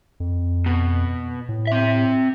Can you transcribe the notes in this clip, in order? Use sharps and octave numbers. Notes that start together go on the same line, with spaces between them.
F2
B2
A2
C4 E5